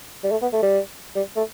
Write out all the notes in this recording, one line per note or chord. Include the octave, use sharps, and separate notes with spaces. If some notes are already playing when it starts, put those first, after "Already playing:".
G3
A3
B3
A3
G3
G3
A3